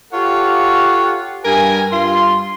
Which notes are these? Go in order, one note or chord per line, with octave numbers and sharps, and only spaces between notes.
F4 G4 A4 C#5 F5 F#5
G2 A#4 G#5
G2 F4 C6